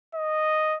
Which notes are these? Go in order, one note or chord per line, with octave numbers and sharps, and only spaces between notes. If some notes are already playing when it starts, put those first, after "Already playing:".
D#5